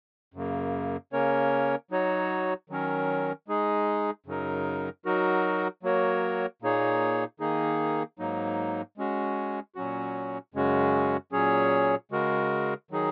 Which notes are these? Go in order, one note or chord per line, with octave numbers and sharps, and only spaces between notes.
F#2 C#3 A#3
C#3 A#3 C#4 A#4 C#5
F#3 D#4 F#4 C#5
D#3 F#3 C#4 A#4
G#3 D#4 G#4
F#2 C#3 F#3 D#4 A#4
F#3 D#4 F#4 A#4
F#3 A#3 F#4 A#4 C#5
A#2 A#3 D#4 G#4 C#5
D#3 A#3 D#4 G#4
G#2 F#3 A#3 D#4
G#3 C#4 F#4
A#2 F#3 C#4 F#4
F#2 C#3 G#3 C#4 F#4
A#2 F#3 C#4 G#4 C#5
C#3 G#3 F#4 A#4
D#3 F#3 D#4 G#4